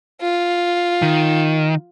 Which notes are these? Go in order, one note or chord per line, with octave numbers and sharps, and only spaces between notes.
F4
D#3